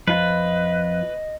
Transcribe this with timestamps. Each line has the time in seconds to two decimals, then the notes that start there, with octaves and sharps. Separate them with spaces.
0.07 F2 F4 B4 D#5